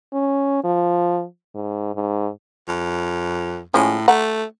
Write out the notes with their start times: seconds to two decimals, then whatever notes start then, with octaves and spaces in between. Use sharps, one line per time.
0.13 C#4
0.64 F3
1.55 G#2
1.95 G#2
2.68 F2
3.74 A2 F3 G#3 C#4
4.08 A3 F#5 A#5